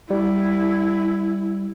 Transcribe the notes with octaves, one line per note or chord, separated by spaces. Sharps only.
G3 E4